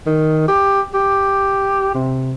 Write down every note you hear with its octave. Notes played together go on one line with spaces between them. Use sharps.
D#3
G4
G4
C3